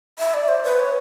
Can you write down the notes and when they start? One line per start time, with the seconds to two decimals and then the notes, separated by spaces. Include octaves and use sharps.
0.19 E5
0.34 D5
0.48 C5
0.64 B4
0.79 C#5